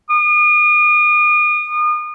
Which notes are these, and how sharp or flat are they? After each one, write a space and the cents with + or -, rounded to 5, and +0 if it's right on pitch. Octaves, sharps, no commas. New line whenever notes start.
D#6 -40